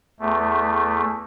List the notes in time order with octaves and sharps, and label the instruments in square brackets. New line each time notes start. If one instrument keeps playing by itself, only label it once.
[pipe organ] E2 A3